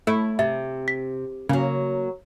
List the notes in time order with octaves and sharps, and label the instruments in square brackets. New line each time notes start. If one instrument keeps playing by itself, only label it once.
[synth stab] A3 [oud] E4
[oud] C3 [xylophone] E5
[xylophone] B6
[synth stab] C#3 [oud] F#3 A#3